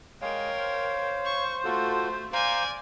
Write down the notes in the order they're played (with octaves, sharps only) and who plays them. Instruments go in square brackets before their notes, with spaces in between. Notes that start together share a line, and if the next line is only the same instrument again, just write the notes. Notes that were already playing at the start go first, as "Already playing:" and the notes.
[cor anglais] G#3 [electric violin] A#4 G5 [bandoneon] C#5 F5
[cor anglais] C5
[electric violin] C#6
[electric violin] A3 [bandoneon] F4 F#4 A4
[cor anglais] C5 [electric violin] D5 G#5 [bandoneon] F5 A#5 G6